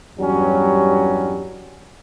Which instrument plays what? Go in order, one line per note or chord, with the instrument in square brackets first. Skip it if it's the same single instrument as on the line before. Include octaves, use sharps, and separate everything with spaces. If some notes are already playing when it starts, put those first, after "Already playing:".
[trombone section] E2 G2 F#3 G3 C#4